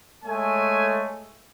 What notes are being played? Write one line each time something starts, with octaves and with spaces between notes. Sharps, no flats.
G#3 A3 C#5 G#5